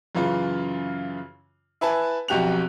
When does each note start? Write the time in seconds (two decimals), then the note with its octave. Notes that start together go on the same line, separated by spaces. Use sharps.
0.15 F#2 C#3 E3 F4
1.81 E4 B4 G#5 A5
2.28 B1 F2 F#4 G4 F#6 F7